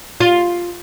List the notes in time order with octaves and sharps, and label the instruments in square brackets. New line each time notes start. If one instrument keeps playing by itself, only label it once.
[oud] F4